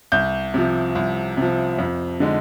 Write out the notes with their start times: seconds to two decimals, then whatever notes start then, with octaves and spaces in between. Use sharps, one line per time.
0.12 C2 G6
0.54 C3 F3
0.95 C2
1.37 C3 F3
1.78 F2
2.20 D3 G#3 D#4